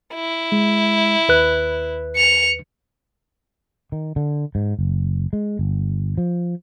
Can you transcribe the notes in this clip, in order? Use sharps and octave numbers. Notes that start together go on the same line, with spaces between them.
E4
G#3
D#2 B4 F#6
C#7 F7
D#3
D3
G#2
F#1
G#3
G1
F3